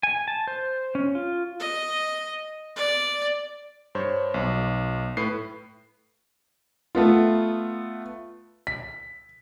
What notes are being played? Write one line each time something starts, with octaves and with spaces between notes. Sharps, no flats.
G#5
A5
C5
C#4
F4
D#5
D5
G2 C5 C#5
B1
A2 B4 C7
A3 B3 F4
B6